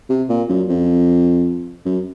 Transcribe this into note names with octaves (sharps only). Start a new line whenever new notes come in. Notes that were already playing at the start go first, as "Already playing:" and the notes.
C3
A#2
F#2
F2
F#2